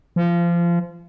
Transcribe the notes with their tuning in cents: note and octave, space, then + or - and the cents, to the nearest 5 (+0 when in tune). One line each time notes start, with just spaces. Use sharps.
F3 -25